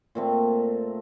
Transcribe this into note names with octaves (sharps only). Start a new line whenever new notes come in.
A#2 A3 C4